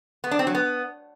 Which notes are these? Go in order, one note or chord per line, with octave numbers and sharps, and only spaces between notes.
B3
D4
C4
F#3
B3